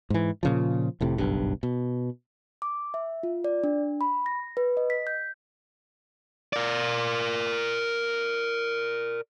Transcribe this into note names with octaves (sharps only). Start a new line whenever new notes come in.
G#2 E3
A#2 C#3 F3
F1 A2 C3
F#1 B1 G2
B2
D6
E5
F4
D5
D4
B5
A#6
B4
D#5
B6
G6
A#4 D5